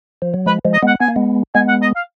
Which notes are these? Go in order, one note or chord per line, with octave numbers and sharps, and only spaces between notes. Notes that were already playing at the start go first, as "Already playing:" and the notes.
F3
F#3
F3 G#3 B4
F3 G#3
D#5
G#3 B3 F#5
B3 G#5
A#3
G#3 B3
G#3 B3 G#5
F#5
D#5
F5